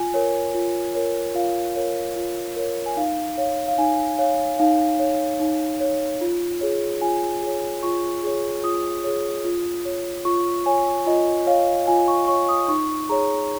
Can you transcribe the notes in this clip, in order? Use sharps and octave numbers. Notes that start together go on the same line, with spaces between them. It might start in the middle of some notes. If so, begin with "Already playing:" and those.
Already playing: F4 G#5
A#4 C#5
F4
A#4 C#5
F4 F5
A#4 C#5
F4
A#4 C#5
G#5
D#4 F5
C#5 F5
F5
D#4 G#5
C#5 F5
D#4 F5
C#5
D#4
C#5
F4
G#4 C#5
F4 G#5
G#4 C#5
F4 C#6
G#4 C#5
F4 D#6
G#4 C#5
F4
C#5
F4 C#6
C#5 G#5
F4 D#5
C#5 F5
F4 G#5
C#6
C#5 C#6
D#6
D#4 C#6
G#4 C#5 A#5